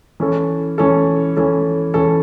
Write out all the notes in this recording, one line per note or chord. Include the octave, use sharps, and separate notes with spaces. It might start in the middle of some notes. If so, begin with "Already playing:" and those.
E3 C#4 A4
E3 C#4 A4
E3 C#4 A4
E3 C#4 A4